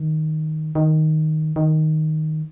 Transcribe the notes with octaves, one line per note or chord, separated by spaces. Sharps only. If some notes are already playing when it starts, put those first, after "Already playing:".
Already playing: D#3
D#3
D#3